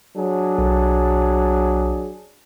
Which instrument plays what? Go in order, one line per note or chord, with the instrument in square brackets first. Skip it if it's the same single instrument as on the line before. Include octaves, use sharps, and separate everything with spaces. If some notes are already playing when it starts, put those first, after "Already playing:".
[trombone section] F#3 D4 G#4
[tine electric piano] B1